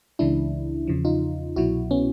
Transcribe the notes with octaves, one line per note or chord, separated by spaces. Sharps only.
C#2 C#3 E3 G#3 D4 E4
E2 C#3 F3
D#4 F4
C2 B2 F#3 E4 F#4
B3 C#4